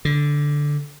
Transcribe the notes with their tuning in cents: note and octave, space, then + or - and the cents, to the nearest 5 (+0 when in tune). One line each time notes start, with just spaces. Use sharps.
D3 -5